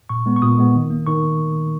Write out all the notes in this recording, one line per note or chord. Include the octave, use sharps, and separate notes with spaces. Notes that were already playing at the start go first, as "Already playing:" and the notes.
A#2 C#6
G#3 B3
C#6
A#2 D#6
G#3 B3
D#3
A#3
D#3 C#6